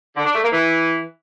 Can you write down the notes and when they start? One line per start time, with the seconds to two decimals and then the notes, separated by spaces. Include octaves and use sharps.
0.16 D3
0.25 D4
0.34 A3
0.43 A#3
0.51 E3